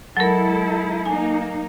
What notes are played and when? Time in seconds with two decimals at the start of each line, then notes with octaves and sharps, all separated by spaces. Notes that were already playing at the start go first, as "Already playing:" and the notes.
0.17 F#3 G#3 E4 A4 A#4
1.06 A#3 D#4 G#5